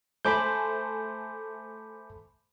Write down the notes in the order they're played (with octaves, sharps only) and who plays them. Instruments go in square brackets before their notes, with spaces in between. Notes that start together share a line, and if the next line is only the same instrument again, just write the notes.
[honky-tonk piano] A3 C5 G#5 [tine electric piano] B5 D6 G6